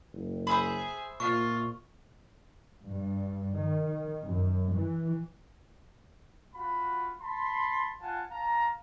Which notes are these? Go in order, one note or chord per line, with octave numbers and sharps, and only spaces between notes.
F#1
G#4 C5 E5 B5
A#2 F4 C#6
G2
D#3
F#2
E3
F4 F#4 B5
A5 B5 C6
F4 F#5 G#5 A5
F5 A5 A#5